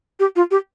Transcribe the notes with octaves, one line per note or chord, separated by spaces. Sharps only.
G4
F4
G4